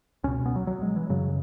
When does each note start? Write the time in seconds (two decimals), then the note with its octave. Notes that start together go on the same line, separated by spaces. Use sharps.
0.24 C#2 B2 C#4
0.46 B3
0.56 F#3
0.67 F#3
0.82 G#3
0.96 E3
1.09 F#2 C#3 F#3